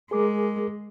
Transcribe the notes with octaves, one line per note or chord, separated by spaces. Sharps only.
G#3 G#4 A#4 D6